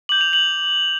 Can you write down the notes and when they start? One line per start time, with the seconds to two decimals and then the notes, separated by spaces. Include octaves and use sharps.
0.09 D6 G6 F#7
0.21 F7
0.33 F#7